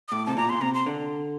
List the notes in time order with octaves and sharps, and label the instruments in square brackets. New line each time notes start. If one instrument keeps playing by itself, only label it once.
[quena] D#6
[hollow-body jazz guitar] A2 [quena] D6
[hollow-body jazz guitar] C3 [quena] A5
[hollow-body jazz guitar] A#2 [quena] A#5
[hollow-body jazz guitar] A#2 [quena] C6
[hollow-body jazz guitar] C3 [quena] A#5
[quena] C6
[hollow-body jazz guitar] D3